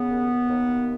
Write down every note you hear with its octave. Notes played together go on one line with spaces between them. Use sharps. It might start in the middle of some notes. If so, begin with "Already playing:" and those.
Already playing: C#3 B3
D#2
D#2